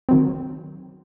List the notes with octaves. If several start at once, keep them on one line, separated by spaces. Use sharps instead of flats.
D#3 F#3 C4